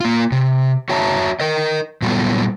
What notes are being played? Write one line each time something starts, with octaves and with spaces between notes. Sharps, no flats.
A#3 F4
C3
F#4 C#5 E5 A5 A#5
A#4 D#5
A#2 F#3 G3 B3 F4 A4